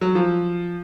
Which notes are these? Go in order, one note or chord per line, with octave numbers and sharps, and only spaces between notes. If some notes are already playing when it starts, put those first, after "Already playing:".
F#3
F3